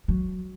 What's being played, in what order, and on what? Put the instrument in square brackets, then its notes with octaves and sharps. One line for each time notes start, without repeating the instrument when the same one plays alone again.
[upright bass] F#3